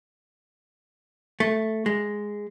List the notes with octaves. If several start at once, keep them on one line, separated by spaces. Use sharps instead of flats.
A3
G#3